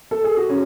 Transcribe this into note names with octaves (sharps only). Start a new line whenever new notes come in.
A4
G#4
F#4
C#4